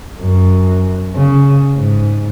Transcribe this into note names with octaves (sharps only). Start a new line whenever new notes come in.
F#2
C#3
G#2